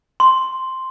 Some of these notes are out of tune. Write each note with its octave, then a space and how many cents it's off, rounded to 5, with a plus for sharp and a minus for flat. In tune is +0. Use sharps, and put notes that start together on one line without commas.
C6 +0